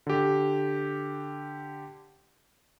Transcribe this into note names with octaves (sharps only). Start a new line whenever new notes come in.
D3 G4